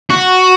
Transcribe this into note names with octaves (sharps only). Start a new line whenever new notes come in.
F#4